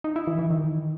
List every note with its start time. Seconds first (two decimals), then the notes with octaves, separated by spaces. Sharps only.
0.04 D#4
0.16 E4
0.27 E3
0.39 E3
0.50 D#3